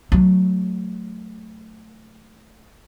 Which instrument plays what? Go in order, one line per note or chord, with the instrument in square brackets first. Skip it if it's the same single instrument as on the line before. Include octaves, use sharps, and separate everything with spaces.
[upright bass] F#3 A3